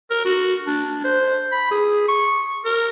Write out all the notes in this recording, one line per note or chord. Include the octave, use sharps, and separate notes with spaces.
A#4
F#4
D4
C5
B5
G#4
C#6
A#4